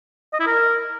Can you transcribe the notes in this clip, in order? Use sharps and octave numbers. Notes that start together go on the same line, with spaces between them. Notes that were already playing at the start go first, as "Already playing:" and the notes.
D#5
E4
A#4